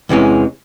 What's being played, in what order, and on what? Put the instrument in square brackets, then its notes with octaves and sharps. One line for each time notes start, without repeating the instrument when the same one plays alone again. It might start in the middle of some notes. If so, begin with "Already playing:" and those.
[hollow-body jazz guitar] E2 C3 E3 G#3 C#4